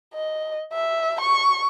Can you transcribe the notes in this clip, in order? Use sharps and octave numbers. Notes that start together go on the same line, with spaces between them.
D#5
E5
C#6